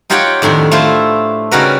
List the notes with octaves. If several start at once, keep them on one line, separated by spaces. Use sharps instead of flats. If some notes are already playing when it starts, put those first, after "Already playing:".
D#4 F4 G4 C#5 F#5 G5
F2 A2 D#3 D4
A3 E4 F4 C5
C#3 G3 D#4 F#4 A#4 B4